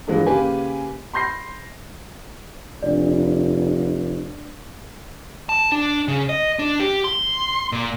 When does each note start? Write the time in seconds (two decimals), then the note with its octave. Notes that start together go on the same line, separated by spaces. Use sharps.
0.07 G2 D3 E3 F3 G#3 A#3
0.27 C#3 A#3 G4 B4 G#5
1.13 B5 C6 G6 A#6 C7
2.82 F1 D4 D5
5.49 A5
5.72 D4
6.08 C#3
6.29 D#5
6.59 D4
6.80 G4
7.04 C6
7.72 A#2